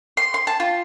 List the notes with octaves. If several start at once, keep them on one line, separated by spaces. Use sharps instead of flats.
C6
C6
A5
F4